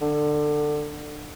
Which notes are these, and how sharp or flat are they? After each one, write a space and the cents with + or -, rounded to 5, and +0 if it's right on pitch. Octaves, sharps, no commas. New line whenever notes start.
D3 +20